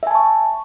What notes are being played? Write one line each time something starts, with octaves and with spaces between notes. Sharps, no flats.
E5 G#5 A5 C#6